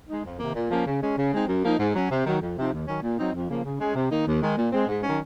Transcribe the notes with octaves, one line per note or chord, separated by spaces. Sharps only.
G#3 D#4
F2
C3 D#3 A#3
A#2
F3 A#3 C#4
C#3
G#3 C#4
C#3
G#3 C4 D#4
F#2
F3 A#3 D#4
G#2
F#3 C#4
C3
D#3 F#3
F2
C3 F3 C4 D#4
D#2
D#3 F#3 C#4
A#2
F#3 C4 D#4
F2
C#3 F3 A#3
C#3
G#3 C#4
C3
D#3 A#3 D#4
D#2
D#3 G#3
A#2
G#3 C4
G#2
D#3 F#3 C#4